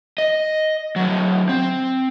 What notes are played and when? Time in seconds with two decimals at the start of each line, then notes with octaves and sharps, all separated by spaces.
0.18 D#5
0.96 D3 F#3
1.49 C4